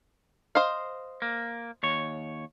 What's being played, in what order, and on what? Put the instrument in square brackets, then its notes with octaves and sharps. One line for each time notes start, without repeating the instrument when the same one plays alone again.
[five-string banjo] C5 D#5 F5
[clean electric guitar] A#3
D#2 C#5